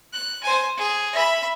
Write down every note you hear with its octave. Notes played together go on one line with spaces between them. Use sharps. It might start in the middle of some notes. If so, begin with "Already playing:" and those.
F#6
C5 G#5
G#4
E5 B5